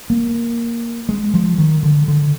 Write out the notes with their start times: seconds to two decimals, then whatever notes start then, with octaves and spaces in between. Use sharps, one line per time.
0.10 A#3
1.09 G#3
1.34 F3
1.58 D#3
1.83 D3
2.08 D3